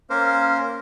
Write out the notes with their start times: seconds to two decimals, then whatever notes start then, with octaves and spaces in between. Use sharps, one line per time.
0.10 A#3 C#4 A#4 C5